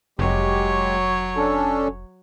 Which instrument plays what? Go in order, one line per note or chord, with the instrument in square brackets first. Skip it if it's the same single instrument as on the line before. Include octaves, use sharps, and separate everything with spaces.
[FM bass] F1 [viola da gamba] F#3 C#5 [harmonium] G#3 G4
[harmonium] C#4 D4 A4